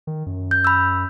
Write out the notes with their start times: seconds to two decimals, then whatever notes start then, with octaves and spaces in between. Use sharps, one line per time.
0.07 D#3
0.26 F#2
0.51 G6
0.64 B5 E6